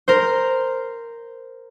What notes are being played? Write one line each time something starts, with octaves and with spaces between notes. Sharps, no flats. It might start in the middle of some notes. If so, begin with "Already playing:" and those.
A#4 C5